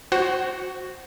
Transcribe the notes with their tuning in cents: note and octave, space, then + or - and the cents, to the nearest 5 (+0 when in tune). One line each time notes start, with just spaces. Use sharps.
F#4 +0 C5 +5 F#5 +25